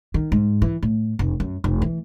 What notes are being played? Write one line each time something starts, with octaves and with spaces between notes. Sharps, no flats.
D#3
G#2
E3
A2
F1
F#2
F1
E3